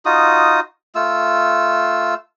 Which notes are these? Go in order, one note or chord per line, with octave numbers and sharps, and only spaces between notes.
D#4 F4 F#4 D#6
A3 F4 E6